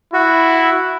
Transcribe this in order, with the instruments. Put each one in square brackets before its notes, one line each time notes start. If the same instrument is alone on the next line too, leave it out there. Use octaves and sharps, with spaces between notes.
[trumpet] E4 [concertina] F#4